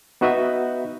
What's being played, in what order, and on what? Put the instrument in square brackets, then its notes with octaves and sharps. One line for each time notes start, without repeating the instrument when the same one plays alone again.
[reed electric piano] B3 D#4 F#4 B4 D#5 E5